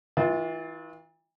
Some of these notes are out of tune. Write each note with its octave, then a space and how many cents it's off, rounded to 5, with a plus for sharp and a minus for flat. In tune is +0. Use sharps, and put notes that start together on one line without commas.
E3 -35 F4 +0